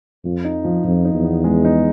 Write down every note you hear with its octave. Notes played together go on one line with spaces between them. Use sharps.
F2 F3
D#4
F3
F2 F3
D#4
E2
B3
G#3
D#4